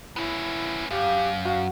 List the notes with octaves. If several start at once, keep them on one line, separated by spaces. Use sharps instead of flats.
B3 C#4 E4
F#2 G4 F5
F#4 F5